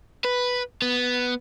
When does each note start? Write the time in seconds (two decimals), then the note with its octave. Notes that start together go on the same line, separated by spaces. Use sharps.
0.25 B4
0.82 B3